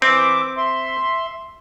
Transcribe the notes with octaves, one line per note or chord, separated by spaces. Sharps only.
E3 C4 E5 D6
E5 C6